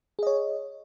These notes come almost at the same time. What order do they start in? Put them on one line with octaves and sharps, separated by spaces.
G#4 D#5 C#5